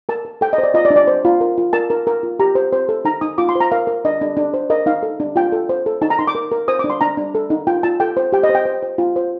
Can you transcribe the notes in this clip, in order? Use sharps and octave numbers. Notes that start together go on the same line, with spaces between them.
A#4 A5
A#4
A4 G5
D#5
C5
D5
F4 D#5
D5
D4
D5
C5
F4
A#4
F4
A#4 A5
A#4
A#4
F4
G4 A#5
C5
C5
A4
D#4 A#5
D#4 D#6
F4 D6
C6
C5 A#5
A#4 F5
A#4
D4 D#5
D4
D4
C5
A#4 D#5
D#4 F5
A4
D4
F4 G5
A4
C5
A4
D#4 A5
A#5
D#4 C6
D6
A#4
A#4
C5 D#6
D4 D6
C6
D4 A#5
D4
A4
D#4
F4 G5
F4 A5
A4 G5
C5
G4 G5
D#5
C5
G5
C5
C5
F4
C5